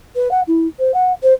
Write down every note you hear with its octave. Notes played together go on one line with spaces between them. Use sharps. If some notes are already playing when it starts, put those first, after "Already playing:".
B4
F#5
E4
C5
F#5
C5